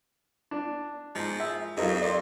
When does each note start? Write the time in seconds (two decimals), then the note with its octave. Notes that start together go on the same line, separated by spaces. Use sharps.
0.51 D4
1.15 G#2 F3
1.40 G#4 E5
1.77 F2 F#3 D#4 G4 A#4 F5
2.02 D5 C6